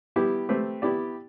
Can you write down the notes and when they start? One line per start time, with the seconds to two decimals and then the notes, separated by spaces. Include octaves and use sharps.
0.16 G3 B3 E4 G4
0.49 A3 C4 G4 B4
0.82 B3 E4 G4 D5